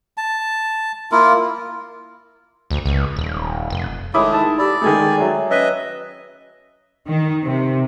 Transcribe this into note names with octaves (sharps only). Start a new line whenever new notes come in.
A5
A#3 E4 F4 A#4
D2
C#2
D#1
F1
D#3 G#3 A3 E4 C#5 B5 D6 D#6
D#4 A5
G4 D5 B5 E6
D#3 G#3 A3 G#5 D#6
F#3 E5
C#4 B4 D#5 E5 E6 F#6 D#7
D#3
C3